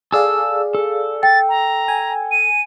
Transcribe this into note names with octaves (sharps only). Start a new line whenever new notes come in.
G#4 A4 D5 F5 E6
A4
G5 A6
A#5
G#5
D#7